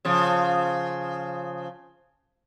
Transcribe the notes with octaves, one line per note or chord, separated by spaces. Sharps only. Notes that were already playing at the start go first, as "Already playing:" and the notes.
C#3 F3